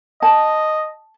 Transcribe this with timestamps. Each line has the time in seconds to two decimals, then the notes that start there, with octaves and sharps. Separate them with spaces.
0.22 D#5 A5